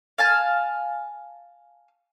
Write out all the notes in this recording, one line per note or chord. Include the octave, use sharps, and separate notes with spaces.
F5 G#5 A5